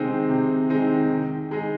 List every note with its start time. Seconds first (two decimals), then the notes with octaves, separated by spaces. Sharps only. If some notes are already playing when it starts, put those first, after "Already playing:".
Already playing: C3 D#3 G#3 C4 D#4
0.29 C3
0.69 D#3 G#3 C4 D#4
1.10 D#3
1.51 G#3 D#4